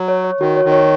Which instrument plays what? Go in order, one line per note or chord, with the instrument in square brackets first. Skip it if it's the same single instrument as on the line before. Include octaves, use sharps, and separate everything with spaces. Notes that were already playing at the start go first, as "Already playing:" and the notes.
Already playing: [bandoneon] F#3
[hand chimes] C#5
C#5
[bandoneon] D#3 [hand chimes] F#4
[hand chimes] C#5
[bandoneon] D#3
[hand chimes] C#5